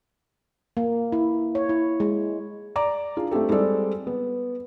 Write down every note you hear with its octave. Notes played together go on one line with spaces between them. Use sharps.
A#3
E4
C#5
E4
G#3
D5 A#5 D6
D4 F4 G#4
A3 C4 D4 G4 A4
G3 G#3 C4 A4 D5
B3